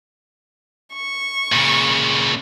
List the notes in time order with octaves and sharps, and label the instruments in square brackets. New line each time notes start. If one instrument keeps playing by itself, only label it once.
[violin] C#6
[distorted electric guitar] A#2 C#3